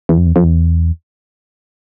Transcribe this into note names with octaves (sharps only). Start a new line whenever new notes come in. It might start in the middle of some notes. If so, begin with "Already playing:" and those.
E2
F2
E2
F2
E2